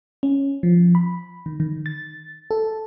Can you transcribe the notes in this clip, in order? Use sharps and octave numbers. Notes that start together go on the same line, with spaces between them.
C#4
F3
B5
D#3
D#3
A6
A4